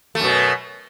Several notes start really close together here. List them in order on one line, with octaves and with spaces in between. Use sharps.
A3 F#2 B2